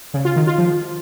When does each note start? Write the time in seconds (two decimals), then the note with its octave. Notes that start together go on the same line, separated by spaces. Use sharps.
0.14 C#3
0.25 F4
0.36 D#3
0.47 F4
0.58 F3